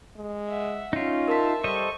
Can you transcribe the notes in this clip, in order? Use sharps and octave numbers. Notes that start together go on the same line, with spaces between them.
G#3
E5 F#5
C#4 D#4 F4
A#4 E5 A5 C6 B6
G3 A4 C5 D#5 C#6